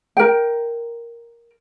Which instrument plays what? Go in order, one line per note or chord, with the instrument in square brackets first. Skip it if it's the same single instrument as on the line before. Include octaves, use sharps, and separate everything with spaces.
[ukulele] A#4 G5